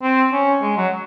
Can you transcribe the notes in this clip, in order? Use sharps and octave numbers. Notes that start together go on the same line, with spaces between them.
C4
C#4
G#3
F#3